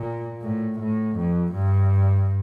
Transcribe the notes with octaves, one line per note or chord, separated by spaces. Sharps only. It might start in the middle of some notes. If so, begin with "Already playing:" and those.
Already playing: A#2
A2
A2
F2
G2